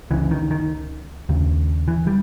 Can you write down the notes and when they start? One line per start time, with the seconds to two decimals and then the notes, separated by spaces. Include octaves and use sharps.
0.11 C#2 C#3 E3
0.31 D#3
0.51 D#3
1.29 D#2 C#3
1.88 E3
2.07 G3